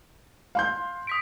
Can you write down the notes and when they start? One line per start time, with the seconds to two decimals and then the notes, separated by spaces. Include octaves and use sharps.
0.55 F5 C6 G6
1.07 D#6 B6 D7